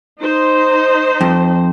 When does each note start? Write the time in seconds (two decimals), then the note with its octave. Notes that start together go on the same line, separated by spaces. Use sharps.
0.20 D#4 C5
1.21 F2